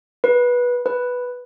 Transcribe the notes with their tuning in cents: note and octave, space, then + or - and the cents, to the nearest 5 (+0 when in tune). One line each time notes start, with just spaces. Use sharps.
B4 -15
B4 +0